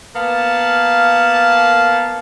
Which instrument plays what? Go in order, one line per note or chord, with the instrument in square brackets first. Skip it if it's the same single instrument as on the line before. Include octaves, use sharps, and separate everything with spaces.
[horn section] A#3 B3 F5 A5